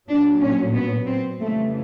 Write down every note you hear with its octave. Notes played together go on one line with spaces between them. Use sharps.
A#2 F#3 D4
C#4
B3
C4
F2 C#3 E3 G3 A3